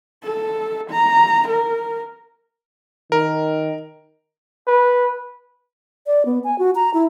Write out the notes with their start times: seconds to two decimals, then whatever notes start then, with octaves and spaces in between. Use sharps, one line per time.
0.24 A4
0.91 A#5
1.48 A#4
3.12 D#3 A#4
4.67 B4
6.07 D5
6.26 B3
6.44 G#5
6.59 F#4
6.75 A#5
6.94 E4